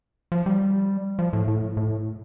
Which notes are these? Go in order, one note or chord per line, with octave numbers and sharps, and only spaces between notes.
F3
G3
F3
A2
A2
A2